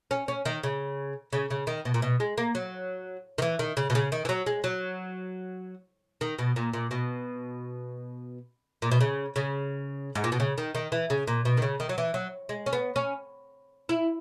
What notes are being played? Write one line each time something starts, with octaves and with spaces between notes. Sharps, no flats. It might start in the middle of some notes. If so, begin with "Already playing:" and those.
C#4
C#4
D#3
C#3
C#3
C#3
D#3
B2
A#2
B2
G#3
A#3
F#3
D#3
E3
D#3
C#3
B2
C#3
D#3
E3
F#3
G#3
F#3
D#3
B2
A#2
A#2
B2
A#2
B2
C#3
C#3
G#2
A#2
B2
C#3
D#3
D#3
E3
C#3
A#2
B2
D#3
C#3
D#3
F#3
E3
F#3
G#3
C#4
B3
C#4
E4